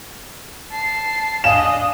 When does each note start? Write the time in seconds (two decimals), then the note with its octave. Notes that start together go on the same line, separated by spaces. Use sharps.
0.71 A5 C7
1.44 D4 D#5 F5 G#5 E7